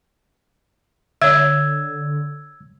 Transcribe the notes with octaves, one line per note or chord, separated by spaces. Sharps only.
D3 C#5 E5 E6 G#6